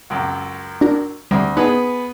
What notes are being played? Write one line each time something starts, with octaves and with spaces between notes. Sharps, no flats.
C#2 F#2
D4 F#4 A#4
D2 G3 A3 C4
B3 D#4 G#4 B4